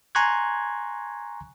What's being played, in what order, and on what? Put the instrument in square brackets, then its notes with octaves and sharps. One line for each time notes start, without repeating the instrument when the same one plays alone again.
[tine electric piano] G#5 A#5 C6 C#6 F#6 G#6